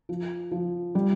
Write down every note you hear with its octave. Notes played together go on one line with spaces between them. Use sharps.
F3
F3
G3